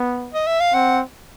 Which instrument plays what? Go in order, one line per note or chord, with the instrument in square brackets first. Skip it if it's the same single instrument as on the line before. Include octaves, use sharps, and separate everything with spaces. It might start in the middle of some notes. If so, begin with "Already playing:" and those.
Already playing: [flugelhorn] B3
[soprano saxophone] D#5
E5
F5
[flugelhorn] C4 [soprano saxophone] F#5